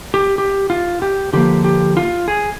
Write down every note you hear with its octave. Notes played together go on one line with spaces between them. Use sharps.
G4
G4
F4
G4
D3 F3 A#3 G4
G4
F4
G#4